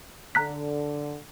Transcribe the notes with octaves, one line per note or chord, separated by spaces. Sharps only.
D3 A#5 F#6 B6